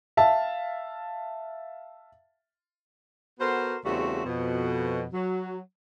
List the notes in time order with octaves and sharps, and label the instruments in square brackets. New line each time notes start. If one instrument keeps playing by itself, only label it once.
[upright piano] E5 F5 A5
[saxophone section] B3 F#4 A4 A#4 C5
E2 C#3 G3 A3 C4 F#4
F2 B2
F#3